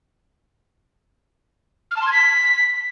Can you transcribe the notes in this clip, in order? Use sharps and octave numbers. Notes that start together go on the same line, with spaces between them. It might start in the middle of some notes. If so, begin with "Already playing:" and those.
F6
A5
C6
G#6
B6